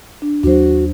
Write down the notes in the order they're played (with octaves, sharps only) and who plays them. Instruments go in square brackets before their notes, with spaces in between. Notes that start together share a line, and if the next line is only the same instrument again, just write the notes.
[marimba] D4
[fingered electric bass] D#2 F#3 [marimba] D4 C5 [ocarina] F#4